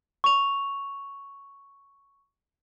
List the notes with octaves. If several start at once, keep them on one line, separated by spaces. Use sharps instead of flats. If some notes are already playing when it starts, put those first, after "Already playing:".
C#6 F7